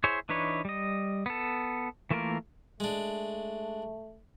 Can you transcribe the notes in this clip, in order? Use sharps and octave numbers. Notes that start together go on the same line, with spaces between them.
E4 G#4 C5 C#5 E5
E3 D4 D#4 B4 C#5
G3 D#5
B3 A4
E3 A3 A#3 F4 A#4
G#3 A3 D4